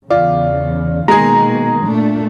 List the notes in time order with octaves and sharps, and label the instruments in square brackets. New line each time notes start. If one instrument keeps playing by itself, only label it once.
[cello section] E2 C#3 [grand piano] F4 [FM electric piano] D5
[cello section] B2 D#3 A#3 [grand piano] G#3 G#4 [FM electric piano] A#5
[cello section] A#2 A3 D4